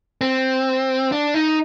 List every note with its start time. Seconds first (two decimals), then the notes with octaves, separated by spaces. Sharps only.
0.21 C4
1.12 D4
1.34 D#4